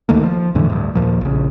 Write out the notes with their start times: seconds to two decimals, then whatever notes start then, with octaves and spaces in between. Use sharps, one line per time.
0.09 D2 D#3 A3 A#3
0.23 F3
0.55 E2 A2 D3 E3
0.70 D2 G2
0.95 D#2 A#2 F3
1.21 A#1 C#3